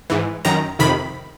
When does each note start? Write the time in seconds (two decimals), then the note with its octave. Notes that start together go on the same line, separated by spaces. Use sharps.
0.10 G#2 E3
0.45 F#2 D#3 A#5
0.79 F2 C3 D#3 B5